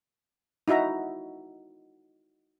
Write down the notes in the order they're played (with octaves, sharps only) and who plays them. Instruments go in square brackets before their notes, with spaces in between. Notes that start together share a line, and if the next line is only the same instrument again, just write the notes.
[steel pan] D#4 E4 F#4 E5 A#5